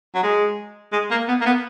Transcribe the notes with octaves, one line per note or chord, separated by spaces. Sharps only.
F#3
G#3
G#3
A#3
B3
A#3
B3